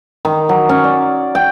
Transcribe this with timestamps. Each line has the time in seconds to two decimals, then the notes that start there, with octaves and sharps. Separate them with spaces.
0.25 D#3
0.49 F#3
0.69 C#4
0.84 D5
1.35 G5